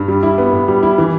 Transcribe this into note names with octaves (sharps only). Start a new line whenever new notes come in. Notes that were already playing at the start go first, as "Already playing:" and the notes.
Already playing: G2
G3
E4
B3
A2
G3
E4
E3